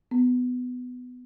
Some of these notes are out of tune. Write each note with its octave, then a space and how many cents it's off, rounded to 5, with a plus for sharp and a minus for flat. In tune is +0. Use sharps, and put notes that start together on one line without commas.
B3 +15